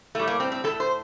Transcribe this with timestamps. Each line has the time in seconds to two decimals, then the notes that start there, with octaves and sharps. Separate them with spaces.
0.15 A2 G3 A3
0.27 A#3
0.40 C4
0.52 C4
0.64 A2 G3 A4
0.80 C5